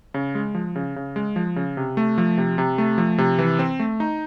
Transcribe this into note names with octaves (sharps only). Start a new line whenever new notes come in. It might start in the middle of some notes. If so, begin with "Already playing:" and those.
C#3
G#3
F3
C#3
C#3
G#3
F3
C#3
C3
A3
F3
C3
C3
A3
F3
C3
E3
C4
A3
D#4